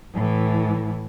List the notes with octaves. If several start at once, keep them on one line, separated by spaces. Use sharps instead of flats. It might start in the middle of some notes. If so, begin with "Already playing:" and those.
A2 E3